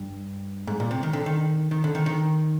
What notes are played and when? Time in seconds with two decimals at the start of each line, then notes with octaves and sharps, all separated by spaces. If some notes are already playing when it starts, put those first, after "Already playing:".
Already playing: G2
0.67 G#2
0.80 A#2
0.91 C3
1.03 D#3
1.13 D3
1.26 D#3
1.71 D#3
1.84 D3
1.95 D#3
2.06 D#3